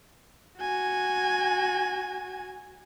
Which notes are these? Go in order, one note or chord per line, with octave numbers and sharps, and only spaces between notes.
F#4 G#5